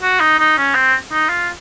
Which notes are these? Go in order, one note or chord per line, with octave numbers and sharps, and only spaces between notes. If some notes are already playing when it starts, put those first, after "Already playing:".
F#4
D#4
D#4
C#4
C4
D#4
F4